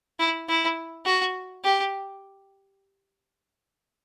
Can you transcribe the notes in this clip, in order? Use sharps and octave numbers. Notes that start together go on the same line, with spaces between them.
E4
E4
F#4
G4